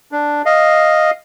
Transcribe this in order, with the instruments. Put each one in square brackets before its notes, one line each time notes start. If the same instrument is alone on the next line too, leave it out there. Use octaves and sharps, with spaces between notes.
[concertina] D4
D#5 F5